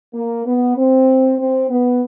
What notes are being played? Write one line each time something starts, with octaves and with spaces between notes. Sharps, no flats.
A#3
B3
C4
C4
B3